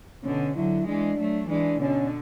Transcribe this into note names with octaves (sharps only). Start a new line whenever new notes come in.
B2 D3 C#4
D3 F#3 E4
E3 G#3 D4
F#3 A3
E3 G#3 D4
B2 D3 C#4